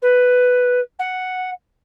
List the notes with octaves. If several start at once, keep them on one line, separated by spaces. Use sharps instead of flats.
B4
F#5